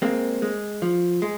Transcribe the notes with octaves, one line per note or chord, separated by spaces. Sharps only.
G#3 A#3 C4
G#3
F3
G#3